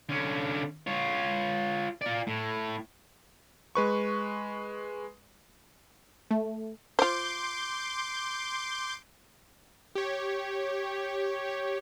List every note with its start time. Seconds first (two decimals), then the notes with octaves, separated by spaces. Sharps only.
0.09 D3 C#4
0.87 F4 C#5
2.02 F4 D5
2.27 A2
3.75 G#3 B4 C#6
6.31 A3
6.99 F4 C5 C6 D6 G6
9.95 G4 C#5